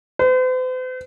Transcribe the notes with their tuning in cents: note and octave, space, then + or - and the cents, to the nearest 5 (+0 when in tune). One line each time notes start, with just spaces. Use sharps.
C5 -45